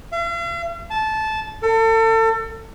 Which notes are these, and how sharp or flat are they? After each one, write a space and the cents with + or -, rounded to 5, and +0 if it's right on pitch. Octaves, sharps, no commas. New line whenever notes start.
F5 -45
A5 -15
A4 +35